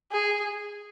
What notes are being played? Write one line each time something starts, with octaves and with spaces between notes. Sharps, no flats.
G#4